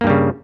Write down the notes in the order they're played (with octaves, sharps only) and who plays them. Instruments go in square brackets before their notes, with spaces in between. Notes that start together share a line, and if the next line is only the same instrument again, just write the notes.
[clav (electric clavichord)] A#3
G2
G3
C#3